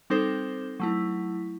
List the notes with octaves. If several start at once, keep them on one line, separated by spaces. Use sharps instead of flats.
G3 C4 D#4 A4 C5
F#3 A3 E4